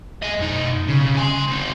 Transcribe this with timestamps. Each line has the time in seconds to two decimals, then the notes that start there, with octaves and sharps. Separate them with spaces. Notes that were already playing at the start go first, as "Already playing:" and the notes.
0.22 G#4 D#5
0.39 F#2 D#4
0.88 B1 C#3
1.17 G#5 C6
1.47 C4 D#4